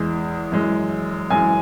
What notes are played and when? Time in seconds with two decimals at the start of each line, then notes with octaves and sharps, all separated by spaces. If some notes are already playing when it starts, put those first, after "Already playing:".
Already playing: E2 E3 G#3
0.52 F#2 E3 G#3
1.30 F#2 E3 G#3 G#5